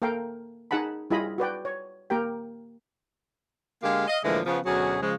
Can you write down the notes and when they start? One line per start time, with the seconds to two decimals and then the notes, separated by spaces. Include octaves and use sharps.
0.02 A#3 A4 A#4 F5 G5
0.71 D#4 G#4 F#5 A5 B5
1.10 G3 E4 F4 G#4 D#5 B5
1.38 F#4 B4 D5 G5
1.65 C#5
2.10 A#3 G4 A#4 G5
3.83 D3 G#3 A#3 G4 F5
4.08 D#5 F5
4.24 A2 D3 E3 F3 G#3 A#3
4.46 C#3 F3 B3
4.66 D2 B2 F#3 C#4 F#4 G#4
5.02 C#3 F3 G#3